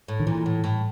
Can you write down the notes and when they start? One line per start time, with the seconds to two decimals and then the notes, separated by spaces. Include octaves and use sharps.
0.08 A2
0.20 D#3
0.27 A#2 E3
0.46 A2
0.64 A2